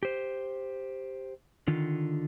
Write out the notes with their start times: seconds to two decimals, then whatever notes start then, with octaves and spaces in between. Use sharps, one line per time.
0.03 G4 C5
1.68 D3 D#3 F4